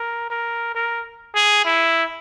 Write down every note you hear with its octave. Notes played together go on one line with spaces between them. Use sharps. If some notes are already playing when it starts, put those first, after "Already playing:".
Already playing: A#4
A#4
A#4
G#4
E4